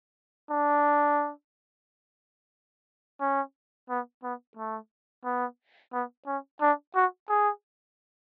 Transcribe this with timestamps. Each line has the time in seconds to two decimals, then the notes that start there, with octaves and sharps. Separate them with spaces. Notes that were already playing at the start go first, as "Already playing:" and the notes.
0.50 D4
3.21 C#4
3.90 B3
4.23 B3
4.57 A3
5.25 B3
5.93 B3
6.27 C#4
6.62 D4
6.95 F#4
7.29 G#4